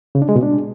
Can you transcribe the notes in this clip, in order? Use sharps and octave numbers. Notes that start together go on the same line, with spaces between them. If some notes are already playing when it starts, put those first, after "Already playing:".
C#3
D4
G#3
B2
D4